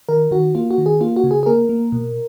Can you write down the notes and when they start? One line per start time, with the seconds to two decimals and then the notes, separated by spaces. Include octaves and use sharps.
0.09 D#3 A#4
0.31 D#3 F#4
0.55 A#3 F4
0.71 F#4
0.78 D#3
0.86 G#4
1.01 A#3 F4
1.16 F#4
1.24 C#3
1.31 G#4
1.43 G#4
1.46 A#3 A#4
1.69 A#3
1.92 B2